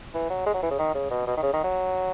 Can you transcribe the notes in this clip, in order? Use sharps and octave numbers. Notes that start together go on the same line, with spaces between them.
E3
F#3
G#3
F#3
E3
C#3
D#3
C#3
B2
B2
D#3
C#3
D#3
F#3